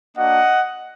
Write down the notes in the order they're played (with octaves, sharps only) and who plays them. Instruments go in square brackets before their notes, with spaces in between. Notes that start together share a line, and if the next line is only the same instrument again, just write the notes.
[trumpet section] A#3 D4 F#4 D#5 F#5